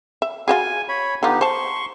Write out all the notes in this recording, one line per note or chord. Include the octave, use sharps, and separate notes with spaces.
E5
F4 F#4 G#4 G#5
C#5 B5
D3 B3 D#4 F4 G4
C5 A5 C6 C#6